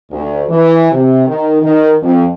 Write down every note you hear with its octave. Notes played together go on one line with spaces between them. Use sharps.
D2
E3
C3
D#3
D#3
F2